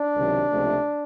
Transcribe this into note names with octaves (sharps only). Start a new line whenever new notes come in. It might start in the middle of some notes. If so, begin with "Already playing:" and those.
Already playing: D4
C#2 C3 D#3 F#3
C#2 C3 F3 A3